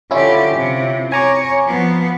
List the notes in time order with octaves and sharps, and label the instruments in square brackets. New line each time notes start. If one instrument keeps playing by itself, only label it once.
[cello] D3 G4 [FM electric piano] C#4 E4 F4
[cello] C3
[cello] C#5 [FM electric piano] G#5 A#5 D6
[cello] F3 B3